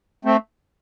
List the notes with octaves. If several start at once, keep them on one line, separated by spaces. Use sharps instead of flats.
A3 C4